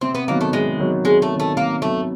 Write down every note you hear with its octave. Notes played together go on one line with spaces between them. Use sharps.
C3 C4
B3
D#3 F#3 A#3 B3
A3
C3 G#3
D#3 F#3 B3
C3 G#3
A3
D#3 F#3 B3
A3
C3 A#3
D#3 F#3 A3 B3